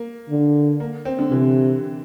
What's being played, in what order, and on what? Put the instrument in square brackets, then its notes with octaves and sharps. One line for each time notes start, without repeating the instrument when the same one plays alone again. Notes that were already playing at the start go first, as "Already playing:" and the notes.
Already playing: [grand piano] A#3
[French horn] D3
[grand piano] A#3
C4
D3
[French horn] C3 [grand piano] E3